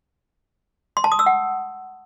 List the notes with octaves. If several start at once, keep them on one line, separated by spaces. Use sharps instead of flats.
C6
A5
D#6
E6
F#5